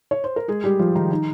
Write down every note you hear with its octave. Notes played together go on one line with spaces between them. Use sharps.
C#5
C5
A#4
G#3 G#4
G3 G4
F3 F4
D#3 D#4
D#3 D#4